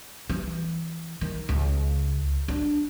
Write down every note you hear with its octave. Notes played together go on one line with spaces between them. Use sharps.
E3
D#3
C#2
D4